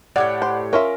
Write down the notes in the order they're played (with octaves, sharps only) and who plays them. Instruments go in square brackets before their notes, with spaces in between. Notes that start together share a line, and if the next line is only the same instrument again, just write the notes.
[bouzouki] A2 G4 C#5 [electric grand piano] D5 F#5
[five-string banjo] C5
[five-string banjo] C#4 F4 E5 [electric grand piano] A#4